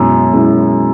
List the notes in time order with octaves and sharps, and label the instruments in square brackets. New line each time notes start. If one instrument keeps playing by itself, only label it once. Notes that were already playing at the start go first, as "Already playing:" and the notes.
Already playing: [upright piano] F#2 [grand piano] B2 G#3 C#4 E4
[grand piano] B2 G#3 C#4 E4